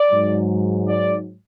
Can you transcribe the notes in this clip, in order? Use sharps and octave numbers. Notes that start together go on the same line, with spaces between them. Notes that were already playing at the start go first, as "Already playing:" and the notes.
Already playing: D5
G#2 F#3
D5